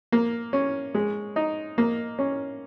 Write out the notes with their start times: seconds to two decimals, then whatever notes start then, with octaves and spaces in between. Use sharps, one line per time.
0.12 A#3
0.53 C#4
0.95 G#3
1.36 D#4
1.78 A#3
2.19 C#4